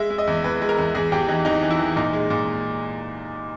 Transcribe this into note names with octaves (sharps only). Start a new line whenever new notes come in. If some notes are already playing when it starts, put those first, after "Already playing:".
Already playing: G#3 E5
G#3
D#5
E2
E2 B4
G#3
A#4
E2
E2 G#4
E2 G4
E3 D#4
E2 D#4
E3
E4
E3
A#2 D#4
G#3
A#2